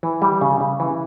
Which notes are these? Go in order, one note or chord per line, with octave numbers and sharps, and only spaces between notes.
E3
G3
C#3
C#3
E3